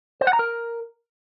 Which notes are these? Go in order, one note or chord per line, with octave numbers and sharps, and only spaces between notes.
C5
F#5
A#5
A#4